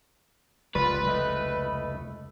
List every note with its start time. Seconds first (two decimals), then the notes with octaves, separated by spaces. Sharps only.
0.75 F1 C#2 G3 F4 B4 D5
1.07 G3 A3 D#5